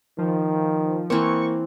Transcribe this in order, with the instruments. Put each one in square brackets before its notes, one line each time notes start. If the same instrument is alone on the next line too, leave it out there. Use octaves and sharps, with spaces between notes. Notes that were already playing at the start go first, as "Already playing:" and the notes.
[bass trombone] D#3 [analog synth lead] F3
[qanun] E3 C4 [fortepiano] A#3 [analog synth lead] C#6